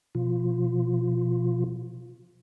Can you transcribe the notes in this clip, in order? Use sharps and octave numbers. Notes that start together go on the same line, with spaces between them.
B2 F3 F4